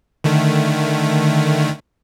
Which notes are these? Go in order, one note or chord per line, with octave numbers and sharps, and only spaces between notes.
D3 D#3 A3